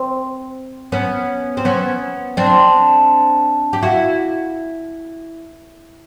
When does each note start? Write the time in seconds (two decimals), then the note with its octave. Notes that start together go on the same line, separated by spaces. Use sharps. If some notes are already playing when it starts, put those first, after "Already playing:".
Already playing: C4
0.92 B3 C#4
1.57 C4
1.65 B3 C#4
2.37 C4 D4
3.73 G4
3.82 E4 F#4